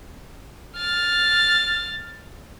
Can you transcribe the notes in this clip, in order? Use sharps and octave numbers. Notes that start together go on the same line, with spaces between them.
F6 A6